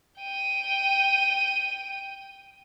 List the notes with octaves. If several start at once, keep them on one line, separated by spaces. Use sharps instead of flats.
G5 D#7